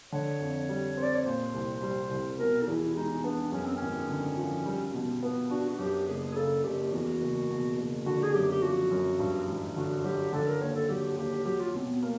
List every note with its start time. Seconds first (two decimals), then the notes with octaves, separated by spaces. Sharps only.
0.12 D3 C#5
0.40 F2
0.69 G3
0.97 C4
1.03 D5
1.15 C#5
1.25 A#2 C5
1.54 C2
1.82 G3
2.11 C2
2.39 B2 A#4
2.62 D#4
2.67 E2 E4
2.95 G#3 D#4
3.24 B3 D4
3.52 F#2 C#4
3.65 C4
3.77 G#1 C#4
4.09 D3
4.37 F3
4.66 G3
4.94 B2
5.23 B3
5.50 D4 F#4
5.69 F#4
5.79 F#2 G4
6.08 F#1 G#4
6.32 G#4
6.36 C#3 A4
6.64 F#1 G4
6.92 E2 F#4
7.21 F#1
7.49 B2
7.78 F#1
8.05 D3 F#4
8.23 G#4
8.34 F#2 G4
8.51 G4
8.62 F3 F#4
8.91 F#2
9.19 G2
9.48 A1
9.76 D3 F#4
10.04 F#3 G4
10.33 D3 A4
10.47 A#4
10.61 D#2 C#5
10.75 A4
10.89 F#3 G4
11.18 D#2 G4
11.45 F#3 G4
11.60 F4
11.75 B2 C4
11.88 B3
12.02 A#3